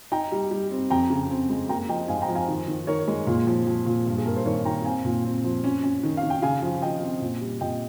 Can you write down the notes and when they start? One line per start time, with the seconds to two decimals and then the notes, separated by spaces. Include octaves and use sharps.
0.12 D#4 G5 A#5
0.32 G3
0.51 G3
0.71 C4
0.90 F2 G5 A#5
1.10 C#3
1.30 C4
1.50 G#3
1.69 A#3 G5 A#5
1.89 F3 D#5 G5
2.08 G#2 F5 G#5
2.22 G5 A#5
2.29 F3
2.35 F5 G#5
2.48 D#3
2.68 D#3
2.87 D#3 A#4 C#5
3.08 G#3
3.27 A#2
3.47 F3
3.67 F3
3.86 A#2
4.06 G2
4.18 G#4
4.26 G2 A#4
4.37 C5
4.45 D#3 A#4 C#5
4.65 D#3 G5 A#5
4.85 C4 F5 G#5
5.05 A#2
5.25 C4
5.44 F3
5.64 C#4
5.83 C#4
6.03 D#3
6.17 F5
6.23 D#3
6.30 G5
6.42 C#3 F5 G#5
6.62 F3
6.82 F3 D#5 G5
7.02 C4
7.21 A#2
7.41 G3
7.61 A#2 D#5 G5